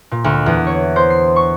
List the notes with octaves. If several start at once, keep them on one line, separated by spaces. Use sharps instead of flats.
A#2
D2
E2
C#5
C5
C7
C#6